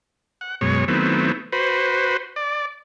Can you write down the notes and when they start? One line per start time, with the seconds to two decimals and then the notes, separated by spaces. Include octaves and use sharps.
0.41 F#5
0.61 F#2 B2 G#3 C#5
0.88 D#3 F#3 A3 B3 C4 E4
1.52 F#4 B4 C5
2.36 D5